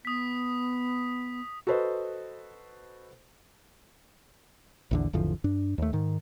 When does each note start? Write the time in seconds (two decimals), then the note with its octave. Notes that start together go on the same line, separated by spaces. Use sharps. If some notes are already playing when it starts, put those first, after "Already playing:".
0.05 B3 D#6 B6
1.67 F#4 A4 B4 C5 D#5
4.91 A#1 E2 D3
5.13 G#1 E2 D3 F3
5.44 G2 D4
5.78 D#2 A3
5.93 G#2 D#3